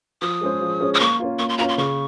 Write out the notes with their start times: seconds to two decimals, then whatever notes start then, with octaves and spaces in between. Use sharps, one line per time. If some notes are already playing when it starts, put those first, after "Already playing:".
0.22 F3 D#6
0.41 G#3 C#4 G#4 C5
0.61 F3
0.80 G#3 C#4 G#4 C5
0.94 D#6
1.00 A#3 C#6
1.20 C#4 F4
1.39 A#3 C#6
1.49 C6
1.58 C#4 F4 A#5
1.68 C6
1.78 C#3 C#6